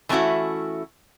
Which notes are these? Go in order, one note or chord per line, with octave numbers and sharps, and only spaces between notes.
E3 A3 B3 C#4 E4 F#4